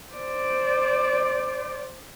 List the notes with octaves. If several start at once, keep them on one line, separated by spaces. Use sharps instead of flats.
C5 D5